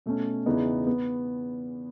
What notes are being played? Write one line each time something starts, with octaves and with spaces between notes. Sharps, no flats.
B2 A3 C#4
E2 C#3 E3 B3 D#4
B3